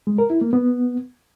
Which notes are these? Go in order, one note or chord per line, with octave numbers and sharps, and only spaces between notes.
G#3
A#4
E4
A#3
B3